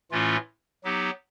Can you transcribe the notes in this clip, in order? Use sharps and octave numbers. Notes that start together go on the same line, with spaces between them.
A2 E3 A3 C#4 E4 F4
F#3 B3 D#4 G4